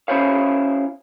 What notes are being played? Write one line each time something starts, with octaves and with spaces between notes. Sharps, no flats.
C#4 E4 F#4 C5 C#5 F5